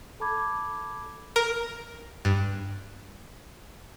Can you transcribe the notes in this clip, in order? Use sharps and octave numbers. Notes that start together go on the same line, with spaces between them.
A4 A5 B5 D6 G#6
A#4
G2